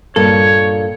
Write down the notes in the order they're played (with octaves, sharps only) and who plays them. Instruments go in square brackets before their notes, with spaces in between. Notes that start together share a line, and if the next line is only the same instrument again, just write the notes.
[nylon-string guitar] G2 A#2 A#3 [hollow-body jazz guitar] A4 [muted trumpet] C#5